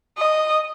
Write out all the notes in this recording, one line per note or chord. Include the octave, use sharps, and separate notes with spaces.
D#5